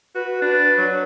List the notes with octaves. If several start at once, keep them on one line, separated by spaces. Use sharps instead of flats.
F#4 B4
D4 B4
F#3